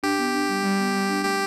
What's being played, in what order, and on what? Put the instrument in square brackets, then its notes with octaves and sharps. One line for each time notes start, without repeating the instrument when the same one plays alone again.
[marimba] D4 [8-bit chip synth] G4
[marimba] B3
D4
G3
G3
B3
G3
D4
[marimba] A3 [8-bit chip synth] G4